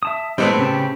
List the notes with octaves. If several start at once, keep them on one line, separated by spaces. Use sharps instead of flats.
E5 A5 D#6
A2 G3 G#3 B3 C4
C#3 G4 A5